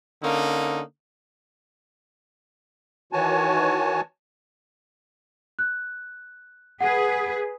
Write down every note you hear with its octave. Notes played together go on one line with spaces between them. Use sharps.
D3 A#3 C#4 D#4
D#3 E3 F#4 C#5 G#5 A5
F#6
G#4 B4 F#5